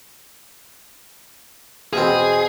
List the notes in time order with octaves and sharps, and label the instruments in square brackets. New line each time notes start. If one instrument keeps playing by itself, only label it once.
[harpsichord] E2 B2 C4 [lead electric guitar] G#4